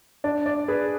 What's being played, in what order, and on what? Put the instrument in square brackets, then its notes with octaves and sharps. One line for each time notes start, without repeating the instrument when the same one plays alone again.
[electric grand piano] D4 [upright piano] D5
[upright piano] D5
[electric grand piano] G#4 [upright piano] B4